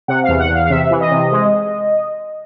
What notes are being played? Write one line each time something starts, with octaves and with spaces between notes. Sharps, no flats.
C3 F#5
E2 F5
F#5
E2
F5
F5
C3 E5
E3
D#5
C3
G#3